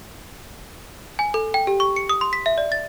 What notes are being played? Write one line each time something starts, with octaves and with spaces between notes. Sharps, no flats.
G#5
A4
G5
G4
C#6
C#7
D#6
C6
B6
E5
D5
A6